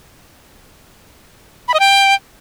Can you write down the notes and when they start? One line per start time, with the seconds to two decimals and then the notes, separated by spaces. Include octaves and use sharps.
1.68 B5
1.74 D#5
1.80 G5